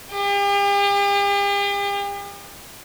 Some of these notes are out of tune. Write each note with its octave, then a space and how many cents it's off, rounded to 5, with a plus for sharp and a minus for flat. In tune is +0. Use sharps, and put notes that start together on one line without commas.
G4 +45